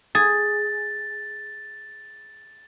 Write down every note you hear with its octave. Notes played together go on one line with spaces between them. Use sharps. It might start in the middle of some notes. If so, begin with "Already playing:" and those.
G#4 A6